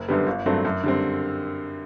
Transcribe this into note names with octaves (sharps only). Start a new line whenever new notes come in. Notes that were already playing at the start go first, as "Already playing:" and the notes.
Already playing: F#1
F#2 D3 G3 B3
G1
G2 F#3 A3 C4
F#2
D3 G3 C4